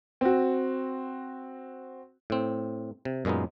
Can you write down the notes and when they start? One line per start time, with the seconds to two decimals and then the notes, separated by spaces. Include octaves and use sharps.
0.21 C4 F#4
2.30 A2 C4
3.05 C3
3.25 F#2 A#2 G#3 B3 D#4